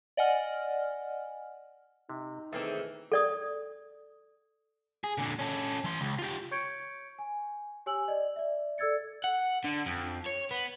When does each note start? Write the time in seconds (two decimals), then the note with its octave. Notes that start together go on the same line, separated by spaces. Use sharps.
0.17 D5 D#5 F#5 G#5 F6
2.09 C3 D#4
2.53 D#3 E3 A3 A#3 C4 G#4 A4 E5
3.12 A4 D5 D#6
5.04 G#4
5.18 A#2 D3
5.39 C#4 A4
5.84 E3 C6
6.01 C#2
6.19 F4 G4
6.51 C#5 C#6 G6 G#6 C#7 D7
7.19 G#5
7.86 G4 C#5 G#5 E6 F#7
8.08 D5 D#5
8.36 D5 E5
8.78 A4 D5 E6 G#6 A6 C#7
9.24 F#5
9.65 D3
9.86 F2
10.26 C#5
10.51 B3